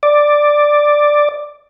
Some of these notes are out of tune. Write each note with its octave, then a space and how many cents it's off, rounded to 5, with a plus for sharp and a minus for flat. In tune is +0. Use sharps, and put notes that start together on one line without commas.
D5 +5